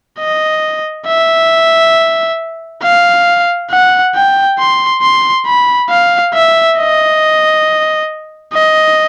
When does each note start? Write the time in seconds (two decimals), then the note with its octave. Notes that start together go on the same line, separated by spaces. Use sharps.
0.19 D#5
1.07 E5
2.82 F5
3.71 F#5
4.15 G5
4.59 C6
5.02 C6
5.46 B5
5.90 F5
6.34 E5
6.78 D#5
8.53 D#5